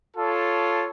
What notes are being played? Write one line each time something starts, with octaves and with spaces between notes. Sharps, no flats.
F4 A4 C#5 A5